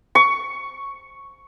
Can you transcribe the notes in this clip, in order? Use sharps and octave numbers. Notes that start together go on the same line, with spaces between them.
C#6